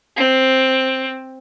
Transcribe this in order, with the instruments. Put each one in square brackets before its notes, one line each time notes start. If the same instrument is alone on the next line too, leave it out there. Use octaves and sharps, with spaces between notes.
[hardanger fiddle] C4